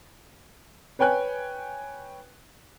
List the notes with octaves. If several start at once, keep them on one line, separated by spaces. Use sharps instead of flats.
B4 C#5 G5 G#5 F#6